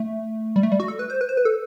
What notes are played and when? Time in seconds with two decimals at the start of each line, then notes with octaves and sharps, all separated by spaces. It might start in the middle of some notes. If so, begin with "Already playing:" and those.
Already playing: A3
0.56 G3
0.63 A3
0.72 G3
0.80 F#4
0.88 A4
0.99 B4
1.10 C5
1.21 B4
1.29 C5
1.37 B4
1.45 A4